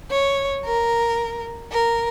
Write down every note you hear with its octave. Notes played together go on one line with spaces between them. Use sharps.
C#5
A#4
A#4